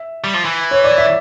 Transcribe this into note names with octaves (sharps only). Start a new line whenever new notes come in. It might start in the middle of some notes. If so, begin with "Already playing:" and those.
Already playing: E5
G3
F3
E3
C#5
D5
E5